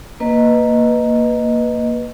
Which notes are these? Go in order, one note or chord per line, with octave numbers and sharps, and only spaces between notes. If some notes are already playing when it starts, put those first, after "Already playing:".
A#3 B4 D#5